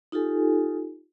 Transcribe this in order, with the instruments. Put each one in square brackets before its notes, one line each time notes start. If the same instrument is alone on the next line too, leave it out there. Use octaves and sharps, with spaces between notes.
[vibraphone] D#4 F4 G4 A4 G#5